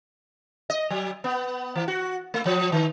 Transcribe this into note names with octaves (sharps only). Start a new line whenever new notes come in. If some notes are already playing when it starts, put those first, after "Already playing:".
D#5
F#3
B3
E3
F#4
A3
F3
D#3